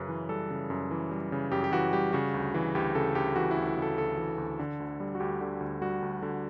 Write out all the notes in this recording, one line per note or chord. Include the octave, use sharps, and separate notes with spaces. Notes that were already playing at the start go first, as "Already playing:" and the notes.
Already playing: F#2 C#3 B4
E3
G3 A4
C#3
F#2
E3
G3
C#3
F#2 G4
G4
E3 F#4
G3 G4
C#3 F#4
D2
E3
D2 G4
C#3 A4
D2 G4
E3 F#4
E4
D2
E4
C#3
A4
D2 A4
E3
D2
D3
D2
G3
F#4
D2 G4
D3
D2
G3 F#4
D2
D3